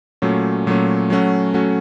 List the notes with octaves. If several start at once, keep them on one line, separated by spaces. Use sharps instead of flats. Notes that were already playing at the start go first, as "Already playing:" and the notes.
A#2 F#3 A3 C#4
A#2 F#3 A3 C#4
F#3 A3 C#4 F#4
F#3 A3 C#4 F#4